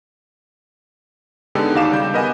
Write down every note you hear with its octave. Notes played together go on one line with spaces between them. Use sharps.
D3 G#3 B3 D#4 G4 A4
D#2 D#4 F#4 F5 D6 E7
C#3 G3 G6
B3 A#4 D#5 F#5 G#5 B5